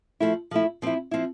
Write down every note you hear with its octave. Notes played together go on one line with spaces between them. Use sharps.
F3 A3 E4
F3 A3 E4
F3 C4 E4
F3 C4 E4